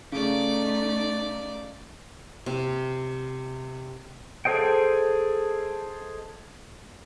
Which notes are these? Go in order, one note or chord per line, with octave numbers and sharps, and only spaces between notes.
C#3 A3 D#4 D5 D6
C3
G#4 A4 C5 D#5 G5